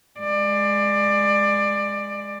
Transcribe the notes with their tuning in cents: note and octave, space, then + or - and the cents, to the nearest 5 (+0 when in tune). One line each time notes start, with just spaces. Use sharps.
G#3 +0 D5 +20